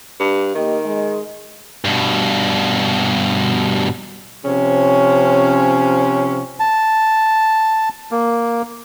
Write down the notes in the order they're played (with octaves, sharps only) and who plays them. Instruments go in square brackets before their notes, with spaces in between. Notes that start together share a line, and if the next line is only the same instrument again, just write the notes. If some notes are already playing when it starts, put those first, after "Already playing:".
[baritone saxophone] G2
[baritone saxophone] D#3 [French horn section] A#3 G4 D#5
[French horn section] G#3 D#5
[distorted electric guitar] G2 B2
[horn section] C3 F3 C#4
[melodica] A5
A#3